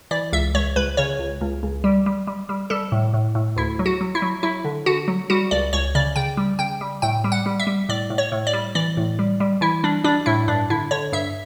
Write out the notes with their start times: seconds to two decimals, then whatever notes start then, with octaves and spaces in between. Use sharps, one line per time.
0.11 E3 D5
0.33 C#2 E5
0.54 C#2 C#5
0.76 C#2 B4
0.97 C#3 C#5
1.19 C#2
1.41 C#2
1.63 C#2
1.84 G3
2.06 G3
2.27 G3
2.49 G3
2.70 G3 A4
2.92 A2
3.14 A2
3.35 A2
3.56 D2 E4
3.79 F#3
3.86 F#4
4.01 F#3
4.15 E4
4.22 F#3
4.43 F#3 E4
4.65 D3
4.86 D3 F#4
5.08 F#3
5.30 G3 F#4
5.51 C#2 D5
5.73 C#2 C#5
5.95 C#3 D5
6.16 C#3 G5
6.37 G3
6.59 C#3 G5
6.81 G3
7.02 A2 G5
7.24 G3
7.32 F#5
7.46 G3
7.60 E5
7.67 G3
7.89 A2 D5
8.10 A2
8.18 C#5
8.32 A2
8.47 D5
8.53 G3
8.75 E3 D5
8.97 A2
9.19 G3
9.40 G3
9.61 E3 E4
9.84 G3 D4
10.04 G3 D4
10.26 A2 E4
10.48 G2 D4
10.70 D3 E4
10.91 D3 C#5
11.12 G2 E5